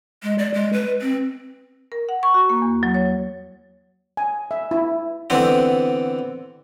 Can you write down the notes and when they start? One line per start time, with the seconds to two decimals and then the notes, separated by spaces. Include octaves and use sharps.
0.23 G#3
0.39 D5
0.54 G#3
0.73 B4
1.01 C4
1.92 A#4
2.09 F#5
2.23 C#6
2.34 F#4
2.49 A#3
2.62 E2
2.83 F#3
2.94 C#5
4.17 G#5
4.51 E5
4.71 E4
5.30 D3 E3 B3 C4